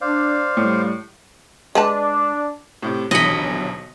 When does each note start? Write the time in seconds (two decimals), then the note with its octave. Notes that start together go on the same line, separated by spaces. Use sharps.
0.01 D4 C5 D5 F5
0.57 A2 G3
1.75 G#3 D4 B4 A5
2.83 A2 C3
3.11 D#1 B1 D3 E3 D#5 B5 C#7 F#7